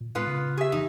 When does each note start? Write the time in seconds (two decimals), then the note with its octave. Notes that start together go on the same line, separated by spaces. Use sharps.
0.01 A#2
0.15 A2 G#3 B3 C4 F4 B4
0.27 C#3
0.57 G4 G#4 E5
0.72 F1 A#2 E3 D#4